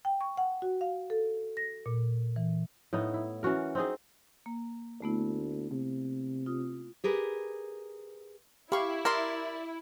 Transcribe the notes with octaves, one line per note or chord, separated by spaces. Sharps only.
G5
C#6
F#5
F#4
F5
A4
A#6
A#2
E3
A2 B3 D#4
E4
E3 C#4 F#4 A#4
C4 D#4 G#4
A#3
D2 A3 B3 E4
C3
F4 D#6
G4 G#4 A#4 B4
E4 G4 F5 B5 C#6
A#4 D5 E5 C6